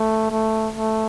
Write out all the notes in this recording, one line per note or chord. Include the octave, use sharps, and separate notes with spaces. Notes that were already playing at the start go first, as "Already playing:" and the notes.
Already playing: A3
A3
A3